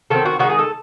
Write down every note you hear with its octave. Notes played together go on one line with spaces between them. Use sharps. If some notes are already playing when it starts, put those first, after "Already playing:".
D#3 F#3 C4 A4
F#4
D#3 G#3 D#4 F#4
G#4
A4